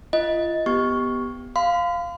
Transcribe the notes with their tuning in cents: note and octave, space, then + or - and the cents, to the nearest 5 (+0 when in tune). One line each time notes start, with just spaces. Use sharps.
F4 -30 D#5 +15
B3 +0 G4 +0 C#6 +0
F5 +0 C6 -45